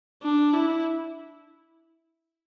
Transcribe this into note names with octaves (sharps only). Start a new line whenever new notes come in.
D4
E4